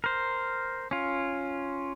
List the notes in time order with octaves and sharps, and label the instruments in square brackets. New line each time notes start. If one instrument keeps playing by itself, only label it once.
[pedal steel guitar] A#4 C5
C#4 F4